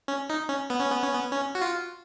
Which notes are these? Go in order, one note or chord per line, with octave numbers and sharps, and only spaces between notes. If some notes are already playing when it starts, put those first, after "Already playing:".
C#4
D#4
C#4
B3
C#4
B3
C#4
B3
C#4
F#4
F4